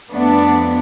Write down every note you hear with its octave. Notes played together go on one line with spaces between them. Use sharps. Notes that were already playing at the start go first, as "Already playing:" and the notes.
F2 F3 A3 B3 D4